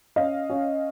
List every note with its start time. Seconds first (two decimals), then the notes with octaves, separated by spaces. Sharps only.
0.16 C#4 D#5 F5
0.50 C#4